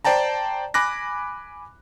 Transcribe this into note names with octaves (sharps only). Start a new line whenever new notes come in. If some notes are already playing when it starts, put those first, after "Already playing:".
C5 D5 G5 A5 A#5
G#5 B5 D6 F#6 A#6